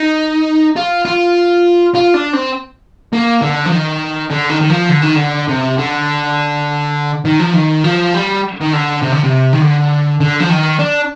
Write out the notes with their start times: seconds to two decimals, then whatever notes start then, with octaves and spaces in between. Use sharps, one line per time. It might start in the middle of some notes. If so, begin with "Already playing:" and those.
Already playing: D#4
0.76 F4
1.05 F4
1.95 F4
2.14 D4
2.33 C4
3.13 A#3
3.42 D3
3.66 F3
3.72 D#3
4.30 D3
4.50 D#3
4.61 D#3
4.70 F3
4.89 D3
5.03 D#3
5.16 D3
5.48 C3
5.78 D3
7.25 D#3
7.40 F3
7.53 D#3
7.84 F3
8.14 G3
8.61 D#3
8.73 D3
9.02 C3
9.12 D3
9.24 C3
9.53 D#3
9.61 D3
10.20 D3
10.40 F3
10.50 D#3
10.79 D4